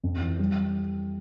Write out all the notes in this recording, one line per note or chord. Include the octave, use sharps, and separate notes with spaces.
F2
E3
G3